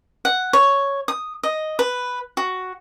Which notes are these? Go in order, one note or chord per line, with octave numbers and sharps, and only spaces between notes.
F#5
C#5
D#6
D#5
B4
F#4